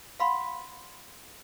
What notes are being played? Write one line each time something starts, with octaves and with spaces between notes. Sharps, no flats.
F5 F#5 B5 C6